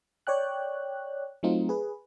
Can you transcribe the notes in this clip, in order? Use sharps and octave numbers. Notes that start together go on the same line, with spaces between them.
C#5 D5 G5 F#6
F#3 A3 C4 D#4 F4
G#4 B4